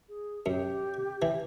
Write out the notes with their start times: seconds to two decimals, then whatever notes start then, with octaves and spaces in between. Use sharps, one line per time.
0.09 G#4
0.46 F#2 G4
1.22 E3